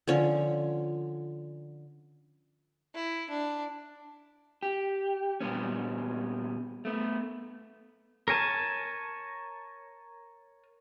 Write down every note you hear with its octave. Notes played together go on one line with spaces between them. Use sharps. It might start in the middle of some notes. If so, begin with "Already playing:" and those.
D3 F3 C#4
E4
D4
G4
A#2 G3 B3 C#4
A3 B3
A#4 C#5 G#5 A5